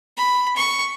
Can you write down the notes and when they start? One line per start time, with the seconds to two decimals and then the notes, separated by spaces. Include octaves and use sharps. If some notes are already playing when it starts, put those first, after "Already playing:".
0.18 B5
0.56 C#6